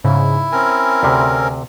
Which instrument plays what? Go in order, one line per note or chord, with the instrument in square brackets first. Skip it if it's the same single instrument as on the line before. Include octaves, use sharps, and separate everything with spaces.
[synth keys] G#2 C#3 [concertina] E4
[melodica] C4 C#4 A#4 [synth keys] G#5
[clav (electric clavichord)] D2 C3